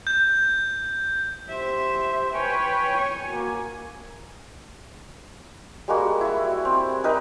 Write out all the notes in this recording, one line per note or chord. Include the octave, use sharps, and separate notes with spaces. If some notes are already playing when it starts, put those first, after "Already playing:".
G6
G4 C5 E5
B4 C#5 G5 G#5
C#5 G#5
A#3 F#4
G3 G#3 A#3 F#4
E4 E5
C4
G3 D#4 A#4 B4